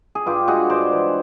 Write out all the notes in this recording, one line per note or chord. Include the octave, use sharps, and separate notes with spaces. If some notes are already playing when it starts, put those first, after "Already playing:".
G#4
G2 F4 G4
G#3 F#4 G#4
G2 C5 D5
E3